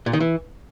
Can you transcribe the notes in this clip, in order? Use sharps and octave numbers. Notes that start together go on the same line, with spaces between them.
A#2
D#3
E3